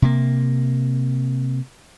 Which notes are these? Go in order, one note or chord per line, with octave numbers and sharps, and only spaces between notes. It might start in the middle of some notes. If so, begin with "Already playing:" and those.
C3 A#3